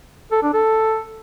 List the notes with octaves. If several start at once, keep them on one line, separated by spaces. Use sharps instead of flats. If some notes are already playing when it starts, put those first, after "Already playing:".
A4
D4
A4